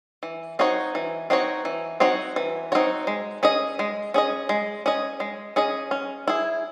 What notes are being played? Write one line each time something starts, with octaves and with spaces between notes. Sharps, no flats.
E3
C4 D#4 F#4 C#5
E3
C4 D#4 F#4 C#5
E3
C4 D#4 F#4 C#5
E3
C4 D#4 F#4 C#5
G#3
C#4 G#4 D#5
G#3
C#4 G#4 D#5
G#3
C#4 G#4 D#5
G#3
C#4 G#4 D#5
C#4
E4 G#4